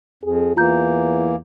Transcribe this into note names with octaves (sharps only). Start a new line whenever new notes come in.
F2 G#4
E2 E3 A#3 F4 A#5 G6